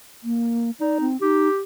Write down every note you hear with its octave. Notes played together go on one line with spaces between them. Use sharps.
A#3
D#4 D5
C4
D#4 G4